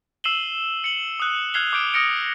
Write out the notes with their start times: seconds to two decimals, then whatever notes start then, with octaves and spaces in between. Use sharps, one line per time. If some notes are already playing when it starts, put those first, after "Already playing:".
0.24 E6 C7 D#7 E7 F#7 G7
0.84 C#7 F#7
1.20 D#6 F#6
1.54 F6 F#6 G#6 C7 F7 G7
1.73 D6 D#6 G6 D7
1.94 D6 D#6 F6 A#6 C#7 D7